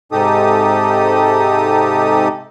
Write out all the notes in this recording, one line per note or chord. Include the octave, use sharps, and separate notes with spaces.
G#2 C3 D#4 G4 A4 D#6